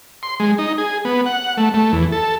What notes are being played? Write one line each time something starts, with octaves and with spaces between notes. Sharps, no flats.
C6
G#3
D#4
G#4
B3
F#5
A3
A3
E2
A4